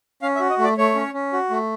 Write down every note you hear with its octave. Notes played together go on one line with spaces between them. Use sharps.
C#4 F5
E5
F#4
D#5
A3
D5
A3 C#5
C#4
C#4
F#4
A3